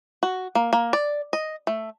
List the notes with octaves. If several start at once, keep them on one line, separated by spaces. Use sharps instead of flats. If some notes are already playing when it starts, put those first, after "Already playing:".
F#4
A#3
A#3
D5
D#5
A3